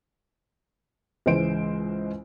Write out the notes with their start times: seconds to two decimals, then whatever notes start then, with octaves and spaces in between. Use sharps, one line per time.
1.26 C#2 G#2 E3 C5 D7